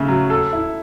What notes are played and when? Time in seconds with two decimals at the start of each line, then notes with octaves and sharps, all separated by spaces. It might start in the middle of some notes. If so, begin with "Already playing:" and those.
Already playing: C#3 A3 E4
0.08 F#3
0.30 A4
0.53 E4